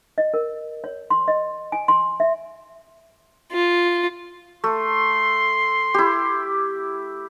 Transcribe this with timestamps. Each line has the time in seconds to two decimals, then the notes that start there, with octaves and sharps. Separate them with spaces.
0.18 D#5
0.34 A#4
0.84 C#5
1.10 C6
1.28 D#5
1.72 G#5
1.88 C6
2.20 E5
3.53 F4
4.64 A3 C6
5.94 E4 G4